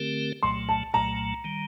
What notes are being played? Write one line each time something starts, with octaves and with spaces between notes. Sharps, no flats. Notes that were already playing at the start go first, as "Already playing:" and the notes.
Already playing: D3 A3 C4 G4 A#4
C2 A#2 F#3 A3 C6
A5
C2 A#2 F#3 A3 A#5
D#3 G3